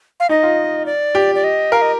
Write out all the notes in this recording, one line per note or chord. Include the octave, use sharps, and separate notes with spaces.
F5
D#4 D#5
F4
D5
G4
D5
D#5
A#4 F5
D#5